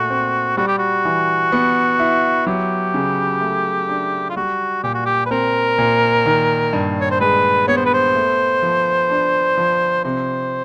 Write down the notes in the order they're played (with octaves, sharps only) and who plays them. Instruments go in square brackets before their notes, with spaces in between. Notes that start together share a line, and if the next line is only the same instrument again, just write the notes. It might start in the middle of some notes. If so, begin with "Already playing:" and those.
Already playing: [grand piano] A#2 A3 [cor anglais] F#4
[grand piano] C4
[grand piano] G3 [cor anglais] F#4
[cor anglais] G4
F#4
[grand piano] E3
B3
E4
[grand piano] F#3 [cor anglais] G4
[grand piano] C#3
A3
D4
[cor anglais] F4
[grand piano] G3 [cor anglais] F#4
[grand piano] A#2 [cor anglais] G4
[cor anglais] F#4
G4
B4
[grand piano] C4 [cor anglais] A#4
[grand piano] A#2
D#3
G2
[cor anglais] C#5
C5
[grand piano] G#3 [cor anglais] B4
[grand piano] B3 [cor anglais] C#5
[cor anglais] C5
B4
C5
[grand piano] A3
F3
D4
F3
[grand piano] C3 [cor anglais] C5